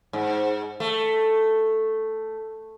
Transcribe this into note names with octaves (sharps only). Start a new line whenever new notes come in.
G#2
A3